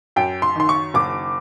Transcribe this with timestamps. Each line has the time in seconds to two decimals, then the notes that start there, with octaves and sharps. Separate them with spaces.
0.16 F#2 G5
0.42 C6
0.56 D#3 C6
0.69 C#6
0.94 F#1 D6